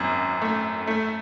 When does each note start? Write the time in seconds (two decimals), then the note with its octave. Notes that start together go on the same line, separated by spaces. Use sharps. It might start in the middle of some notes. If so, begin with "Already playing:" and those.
Already playing: G#1 F#2
0.42 A3
0.87 A3